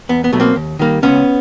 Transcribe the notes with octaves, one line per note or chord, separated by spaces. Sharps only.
E2 B3
B3
B2 F#3 A3
A#3 C4
D#2
D#3 G3 A#3
C#2 B3 C#4